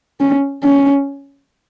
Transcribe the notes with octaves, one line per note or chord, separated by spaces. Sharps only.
C#4
C#4